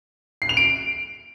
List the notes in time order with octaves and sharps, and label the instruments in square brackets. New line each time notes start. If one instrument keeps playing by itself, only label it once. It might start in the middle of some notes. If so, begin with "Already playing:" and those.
[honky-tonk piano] C7
F7
D7